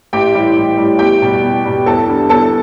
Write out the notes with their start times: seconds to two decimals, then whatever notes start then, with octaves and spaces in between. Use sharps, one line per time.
0.13 A1 G4 G5
0.34 A2 E3 G3
0.56 A1
0.78 A2 E3 G3
0.99 E2 G4 G5
1.22 B2 G3
1.43 E2
1.65 B2 G3
1.86 E2 A4 A5
2.08 D3 G3
2.29 E2 A4 A5